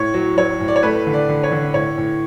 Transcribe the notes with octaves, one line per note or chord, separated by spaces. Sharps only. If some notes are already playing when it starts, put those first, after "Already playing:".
Already playing: A2 C#5
F#3
F#3 C#5
A2
D5
C#5
A3 B4
D3
D5
D3
C#5
D3
A2 C#5
A2